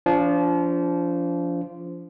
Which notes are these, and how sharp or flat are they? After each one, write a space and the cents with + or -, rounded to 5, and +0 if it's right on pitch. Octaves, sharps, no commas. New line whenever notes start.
F3 -15 D4 -35